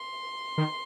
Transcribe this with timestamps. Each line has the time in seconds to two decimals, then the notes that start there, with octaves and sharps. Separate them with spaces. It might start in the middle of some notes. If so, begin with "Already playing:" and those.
Already playing: C6
0.58 D#3